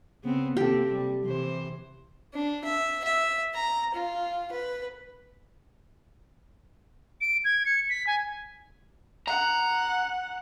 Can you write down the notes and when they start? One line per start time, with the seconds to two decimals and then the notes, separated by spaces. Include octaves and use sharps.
0.23 C#3 B3 C4
0.57 C3 A#3 C4 G4 A4
0.92 G3
1.25 C3 E3 C5
2.34 D4
2.64 E5
3.04 E5
3.54 A#5
3.94 F4
4.52 B4
7.21 D7
7.45 G#6
7.66 C#7
7.90 B6
8.07 G#5
9.28 F#5 A#5